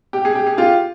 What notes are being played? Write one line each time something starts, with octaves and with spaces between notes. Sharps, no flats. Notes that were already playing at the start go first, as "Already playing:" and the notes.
G4
G#4
G4
G#4
F4 G4